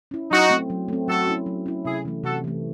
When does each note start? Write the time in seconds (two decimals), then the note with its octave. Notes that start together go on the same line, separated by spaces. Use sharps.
0.11 C#4 E4
0.31 F#3 D#4 F#4
0.50 A3 C4
0.70 F#3
0.88 A3 C4
1.08 F#3 F#4 A4
1.27 C#4 E4
1.46 F#3
1.66 C#4 E4
1.85 C3 E4 G#4
2.05 E3 A3
2.24 C3 F#4 A4
2.44 E3 A3